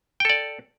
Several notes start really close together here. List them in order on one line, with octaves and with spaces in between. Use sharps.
G5 A4 D5